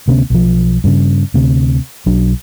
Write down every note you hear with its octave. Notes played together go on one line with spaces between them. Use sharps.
D2 C3 B3 C#4
B1 F3
G2 C#3
D2 C3
B1 F#3 D4